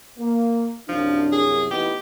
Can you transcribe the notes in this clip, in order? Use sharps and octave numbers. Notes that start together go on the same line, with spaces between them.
A#3
C2 F#2 F3 D4
G#4
A1 E3 B3 D#4 E4 G4